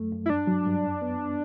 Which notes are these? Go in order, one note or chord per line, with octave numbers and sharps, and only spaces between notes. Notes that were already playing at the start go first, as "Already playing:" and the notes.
Already playing: F#2 A3
F#2
E4
G2 D4
F#3
G2
F#2
B3